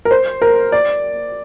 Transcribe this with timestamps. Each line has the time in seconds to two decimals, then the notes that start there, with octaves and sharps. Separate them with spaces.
0.05 A#4
0.11 C5
0.42 A#4
0.72 D5